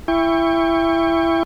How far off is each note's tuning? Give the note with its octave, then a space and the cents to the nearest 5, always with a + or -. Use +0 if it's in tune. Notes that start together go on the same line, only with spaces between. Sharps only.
E4 +15 G5 +35 C#6 +0